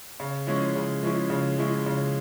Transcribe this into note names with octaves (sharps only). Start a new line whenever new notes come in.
C#3
F3 G#3 C#4 E4
C#3
F3 G#3 C#4 E4
C#3
F3 G#3 C#4 E4
C#3